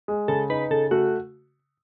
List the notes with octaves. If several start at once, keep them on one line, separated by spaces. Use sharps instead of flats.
G#3
C#3 A4
D#4 B4
C#3 A4
A3 F#4